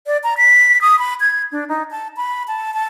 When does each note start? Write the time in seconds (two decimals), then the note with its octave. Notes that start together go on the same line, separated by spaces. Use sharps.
0.07 D5
0.24 A#5
0.37 B6
0.81 D#6
0.99 B5
1.21 G#6
1.52 D4
1.69 D#4
1.91 A5
2.17 B5
2.48 A5
2.74 A5